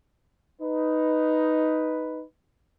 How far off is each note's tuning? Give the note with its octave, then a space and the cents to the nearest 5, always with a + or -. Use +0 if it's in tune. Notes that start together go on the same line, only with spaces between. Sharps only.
D#4 +5 B4 +0